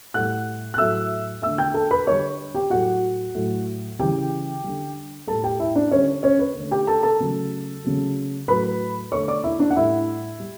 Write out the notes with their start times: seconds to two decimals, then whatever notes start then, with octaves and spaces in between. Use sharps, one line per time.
0.14 A2 G3 F#5 F#6
0.74 F#6
0.78 A2 F#3 A3 E5 E6
1.42 D3 A3 E5 E6
1.58 G5 G6
1.74 A4 A5
1.91 B4 B5
2.07 D3 G3 C#5 C#6
2.55 G4 G5
2.70 A2 F#3 A3 F#4 F#5
3.34 A2 F#3 A3
3.99 C#3 E3 G3 G4 G5
4.64 D3 G3
5.27 A2 G3 A4 A5
5.44 G4 G5
5.60 E4 E5
5.75 D4 D5
5.91 D3 G3 C#4 C#5
6.23 C#4 C#5
6.39 B4
6.55 D3 A3
6.71 G4 G5
6.87 A4 A5
7.03 A4 A5
7.20 C#3 F#3 A3
7.84 C#3 F#3 A3
8.48 A2 F#3 A3 B4 B5
9.12 D3 A3 C#5 C#6
9.28 D5 D6
9.44 E4 E5
9.59 D4 D5
9.70 F#5
9.76 A2 G3 E4 E5
10.40 G3